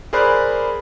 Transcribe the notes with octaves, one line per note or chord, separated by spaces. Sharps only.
G#4 A#4 C5 D5 B5 F#6